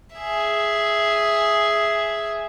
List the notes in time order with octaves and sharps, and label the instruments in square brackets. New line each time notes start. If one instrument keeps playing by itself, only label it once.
[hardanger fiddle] G#4 E5